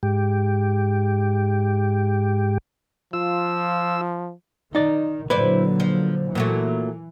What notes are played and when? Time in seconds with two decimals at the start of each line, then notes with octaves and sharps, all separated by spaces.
0.03 G#2 G4
3.13 F3 F4 E6
4.75 D#3 D#4 D5
5.30 A#2 D3 F#3 E4 B4 C5 D5
5.80 F3
6.35 A#2 E3 F#3 A3